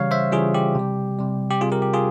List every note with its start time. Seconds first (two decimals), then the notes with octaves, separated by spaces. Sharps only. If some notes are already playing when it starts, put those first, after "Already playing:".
Already playing: C#3 E3 G3 C#5 F5
0.11 C5 E5
0.32 C#3 E3 G3 F4 G#4
0.54 G4
0.75 C3 G3
1.19 C3 G3
1.51 G4
1.61 C3 G3 F4 G#4
1.72 G4 A#4
1.82 G4
1.93 F4 G#4